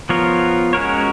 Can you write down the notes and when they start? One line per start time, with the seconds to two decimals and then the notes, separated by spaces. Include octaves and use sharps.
0.09 F3 B3 F4 A#4 C#5
0.73 G#3 C#4 F#4 A#4 C#5